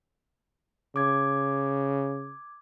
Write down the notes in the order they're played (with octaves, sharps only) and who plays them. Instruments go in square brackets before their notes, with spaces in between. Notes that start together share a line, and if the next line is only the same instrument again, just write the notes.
[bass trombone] C#3 [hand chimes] D6 G#6